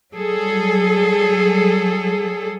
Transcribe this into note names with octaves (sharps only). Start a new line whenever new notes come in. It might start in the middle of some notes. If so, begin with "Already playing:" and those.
F#3 G3 G#4 A4